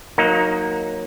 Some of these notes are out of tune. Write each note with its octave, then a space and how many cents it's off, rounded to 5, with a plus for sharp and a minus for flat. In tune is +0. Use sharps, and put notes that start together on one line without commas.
F#3 -15 A#3 +0 D#4 +10